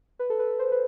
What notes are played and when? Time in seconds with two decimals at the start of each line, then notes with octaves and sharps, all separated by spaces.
0.19 B4
0.30 A4
0.39 B4
0.59 C5
0.72 B4